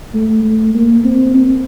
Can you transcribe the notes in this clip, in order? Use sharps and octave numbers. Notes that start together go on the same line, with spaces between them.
A3
A3
A#3
C4
C4